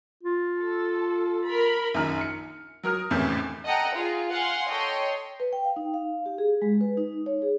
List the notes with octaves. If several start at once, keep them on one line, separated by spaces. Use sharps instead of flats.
F4
A4
A#4 B5
A#1 F#2 D#3 A#5 F6
C#7
F#3 A#4 D#6 F6
G#1 E2 A2 C3 C#4 G6
A4 D#5 F#5 G5 A#5
F4 G#4
F5 F#5 G#5 C6
A4 C#5 D#5 G5 C6
B4
G5
F5
D#4
F5
G4
G#4
G#3
B4
D#4
C#5
G#4